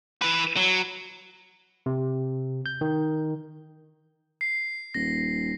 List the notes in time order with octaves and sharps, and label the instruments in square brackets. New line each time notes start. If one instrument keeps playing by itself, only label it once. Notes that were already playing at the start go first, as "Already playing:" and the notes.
[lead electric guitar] E3 B4
F#3
[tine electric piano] C3
G6
D#3
[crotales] C7
[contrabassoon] D#1 [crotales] A#6